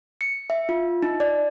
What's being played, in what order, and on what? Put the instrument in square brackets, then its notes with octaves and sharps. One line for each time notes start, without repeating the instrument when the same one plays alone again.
[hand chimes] C#7
E5
F4
D#4
D5